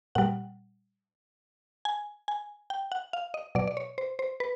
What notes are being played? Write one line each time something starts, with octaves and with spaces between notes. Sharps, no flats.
A#2 G3 F#5
G#5
G#5
G5
F#5
F5
D#5
B2 F#3 D5
D5
C#5
C5
C5
B4